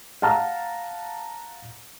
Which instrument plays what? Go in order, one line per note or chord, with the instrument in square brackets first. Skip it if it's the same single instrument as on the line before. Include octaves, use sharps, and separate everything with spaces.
[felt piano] F5 F#5 A5 A#5 F6